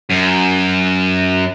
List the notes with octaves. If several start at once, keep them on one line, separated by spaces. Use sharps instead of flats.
F#2